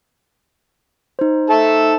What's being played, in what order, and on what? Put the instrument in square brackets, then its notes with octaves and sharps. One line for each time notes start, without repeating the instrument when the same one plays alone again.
[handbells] D#4 C5
[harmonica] A4 E5 A5